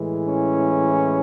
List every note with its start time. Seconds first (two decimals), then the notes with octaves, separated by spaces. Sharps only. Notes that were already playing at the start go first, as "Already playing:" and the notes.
Already playing: A2 E3 G#3
0.28 C#4